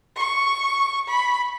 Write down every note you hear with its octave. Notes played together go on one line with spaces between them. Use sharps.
C#6
B5